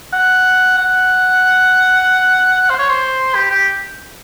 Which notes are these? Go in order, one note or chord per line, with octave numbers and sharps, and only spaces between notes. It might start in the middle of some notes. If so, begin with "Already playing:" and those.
F#5
F#5
C5
C#5
C5
G4
G4